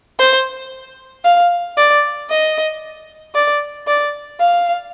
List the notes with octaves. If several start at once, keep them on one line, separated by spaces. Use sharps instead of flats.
C5
F5
D5
D#5
D5
D5
F5